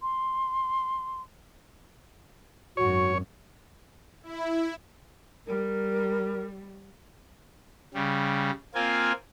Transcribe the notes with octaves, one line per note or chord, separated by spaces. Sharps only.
C6
G#1 F#2 F#4 C#5
E4
G3 A#4
C#3 G3
A#3 C4 F4 G#5